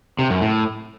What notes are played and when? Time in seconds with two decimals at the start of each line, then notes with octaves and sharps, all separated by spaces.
0.19 C3
0.30 F#2
0.41 A2